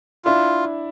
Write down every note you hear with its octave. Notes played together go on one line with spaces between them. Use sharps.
D4 E4 F4